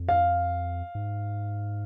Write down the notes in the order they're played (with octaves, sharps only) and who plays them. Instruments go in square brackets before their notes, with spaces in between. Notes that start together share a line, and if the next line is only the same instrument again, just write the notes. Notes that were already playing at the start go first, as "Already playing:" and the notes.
Already playing: [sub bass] F2
[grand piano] F5
[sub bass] G#2